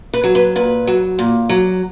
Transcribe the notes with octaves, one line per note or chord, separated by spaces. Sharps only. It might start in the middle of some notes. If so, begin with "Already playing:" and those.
B4
F#3
B4
A#2 B4
F#3
A#2
F#3